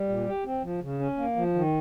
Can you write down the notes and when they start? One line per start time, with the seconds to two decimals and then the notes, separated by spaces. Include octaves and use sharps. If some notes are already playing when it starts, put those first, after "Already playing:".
Already playing: G3
0.09 A#2
0.27 G4
0.45 C4
0.63 F3
0.82 C#3
0.99 C#4
1.18 A#3
1.36 F3
1.55 D#3